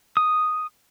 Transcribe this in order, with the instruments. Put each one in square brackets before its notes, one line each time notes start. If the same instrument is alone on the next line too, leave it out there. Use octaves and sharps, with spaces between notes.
[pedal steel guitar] D#6